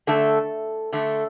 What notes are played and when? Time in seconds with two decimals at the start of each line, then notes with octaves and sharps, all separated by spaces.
0.07 D3 A3 A4
0.93 D3 A3